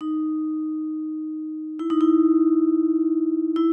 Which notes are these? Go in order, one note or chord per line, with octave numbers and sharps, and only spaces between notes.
D#4
E4
D#4
E4
E4